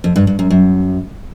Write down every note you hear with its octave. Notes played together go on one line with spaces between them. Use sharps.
F2
G2
G2
F#2
F#2